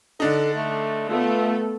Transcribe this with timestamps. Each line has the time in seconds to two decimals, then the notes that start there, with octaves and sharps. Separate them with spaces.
0.20 D3 D4 D#4 A4
0.55 A3
1.10 A3 B3 F4 A4